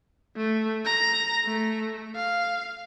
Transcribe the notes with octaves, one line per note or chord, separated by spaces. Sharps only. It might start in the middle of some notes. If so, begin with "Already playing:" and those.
A3
A#5
A3
F5